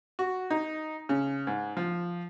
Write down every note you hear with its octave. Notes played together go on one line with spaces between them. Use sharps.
F#4
D#4
C#3
G#2
F3